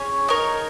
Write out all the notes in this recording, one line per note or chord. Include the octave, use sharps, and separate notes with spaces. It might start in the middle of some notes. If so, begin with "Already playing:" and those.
Already playing: C#4 G#4 C#5 G#5
D#4 A#4 C#5